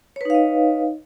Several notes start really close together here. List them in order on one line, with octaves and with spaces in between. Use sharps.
C#5 B4 D#4 F5 D#5